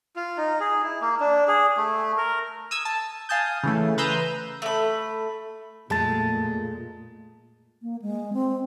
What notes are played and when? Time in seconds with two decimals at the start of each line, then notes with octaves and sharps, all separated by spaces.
0.16 F4
0.37 D#4
0.60 G#4
0.84 E4
1.01 A#3
1.20 D4
1.48 G#4
1.77 A3
2.17 A#4
2.71 D#6 E6 G#6
2.85 A5
3.29 F5 G#5 A5 D#6 G6
3.63 C#3 E3 A3
3.98 B4 A#5 C6 D#6 E6 G6
4.62 A3 B5
5.90 F2 A#2 G#3 A3 A5 A6
7.82 A#3
8.02 G#3
8.33 C4